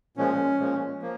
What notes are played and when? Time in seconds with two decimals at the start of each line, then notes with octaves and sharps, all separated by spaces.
0.17 A#2 F3 G#3 C#4
0.60 A#2 F3 G#3
1.02 F3 A#3